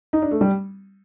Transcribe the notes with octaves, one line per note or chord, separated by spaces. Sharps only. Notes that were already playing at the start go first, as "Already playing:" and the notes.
D#4
D4
A3
G3